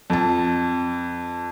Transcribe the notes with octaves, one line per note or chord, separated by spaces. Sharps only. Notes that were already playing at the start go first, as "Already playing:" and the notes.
F2 A5